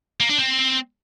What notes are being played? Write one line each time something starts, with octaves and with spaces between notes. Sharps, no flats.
A#3
D4
C4